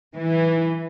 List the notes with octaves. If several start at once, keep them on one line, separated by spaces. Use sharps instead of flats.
E3